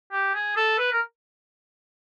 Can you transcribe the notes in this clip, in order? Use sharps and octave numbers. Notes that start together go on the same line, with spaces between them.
G4
G#4
A4
B4
A#4